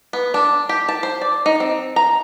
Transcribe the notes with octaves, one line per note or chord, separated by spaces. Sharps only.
B3
D4
G4
A5
C5
D5
D#4
C4
A#5